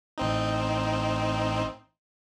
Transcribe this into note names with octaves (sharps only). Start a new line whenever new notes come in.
A1 C4 D#4